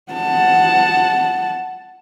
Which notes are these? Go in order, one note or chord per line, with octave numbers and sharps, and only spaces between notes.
F#5 A5